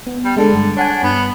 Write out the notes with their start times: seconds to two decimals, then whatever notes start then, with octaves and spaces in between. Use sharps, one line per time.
0.07 B3
0.24 G3
0.37 D3 G#3 D4 A4
0.54 G2
0.77 D4 C#5 F#5 G#5
1.03 G2 B3 B5